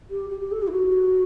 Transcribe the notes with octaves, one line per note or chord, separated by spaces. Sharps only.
G4
G4
G4
A4
G4
E4
F#4